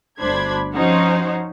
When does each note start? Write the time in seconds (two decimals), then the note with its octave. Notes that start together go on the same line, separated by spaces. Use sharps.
0.20 G1 D2 D4 C5 B5 G#6
0.73 F3 C#4 D#4 F#4 C5